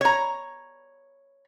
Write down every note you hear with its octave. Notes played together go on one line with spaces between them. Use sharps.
C#5 A#5